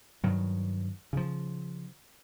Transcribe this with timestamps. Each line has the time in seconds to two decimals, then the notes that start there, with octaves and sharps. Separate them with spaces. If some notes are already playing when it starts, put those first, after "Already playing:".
0.23 G2 D#3 F#3
1.13 C#3 F3